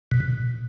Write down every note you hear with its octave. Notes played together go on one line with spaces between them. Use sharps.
B2